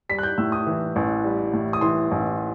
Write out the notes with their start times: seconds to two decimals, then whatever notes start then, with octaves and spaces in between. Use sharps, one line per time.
0.09 G3 B6
0.19 F#6
0.23 G6
0.38 A2 E6
0.52 D#6
0.67 E3
0.96 A1
1.24 G3
1.54 A2
1.73 D#6
1.81 E3 C6
2.11 A1